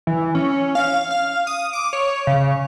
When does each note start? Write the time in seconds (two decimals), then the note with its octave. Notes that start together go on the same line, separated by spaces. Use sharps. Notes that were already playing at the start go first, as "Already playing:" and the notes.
0.07 E3
0.35 C#4
0.75 F5
1.11 F5
1.47 D#6
1.73 D6
1.93 C#5
2.27 C#3